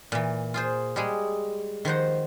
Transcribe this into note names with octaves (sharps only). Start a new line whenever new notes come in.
A#2 E3
F4 G#4 C5
G3 G#3 G#4
D#3 F3 C5 F#5